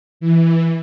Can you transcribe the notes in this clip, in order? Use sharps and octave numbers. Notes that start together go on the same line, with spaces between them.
E3